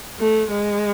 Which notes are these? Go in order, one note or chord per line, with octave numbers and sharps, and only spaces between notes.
A3
G#3